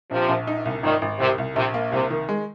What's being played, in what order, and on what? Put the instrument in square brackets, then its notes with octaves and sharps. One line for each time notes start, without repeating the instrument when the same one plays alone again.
[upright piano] A#1 [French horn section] C3 F3
[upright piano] A#1
D#4
C2
[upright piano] G#1 [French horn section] A#2 D#3
[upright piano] G#1
[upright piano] C2 [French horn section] C3
[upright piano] C2
[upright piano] A#1 [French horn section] C3
[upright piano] A#3
[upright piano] C2 [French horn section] C3
[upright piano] D#3
G#3